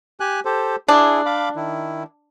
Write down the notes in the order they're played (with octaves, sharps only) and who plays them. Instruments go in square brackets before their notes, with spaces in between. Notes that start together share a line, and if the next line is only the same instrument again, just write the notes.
[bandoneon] G4 G#5 F#6
G4 A4 C5
[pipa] D4 [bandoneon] E4 G#4
[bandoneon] F5 B5 D6
D#3 E4